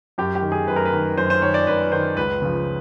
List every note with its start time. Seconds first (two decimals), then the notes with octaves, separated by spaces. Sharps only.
0.18 F#2 G4
0.35 G4
0.42 D#3
0.52 G#4
0.68 F#2 B4
0.76 A#4
0.85 B4
0.93 D#3
1.18 F#2 C5
1.30 C5
1.42 D#3 C#5
1.54 D5
1.67 F#2 B4
1.92 D#3 C5
2.17 C#2 B4
2.42 C#3 F3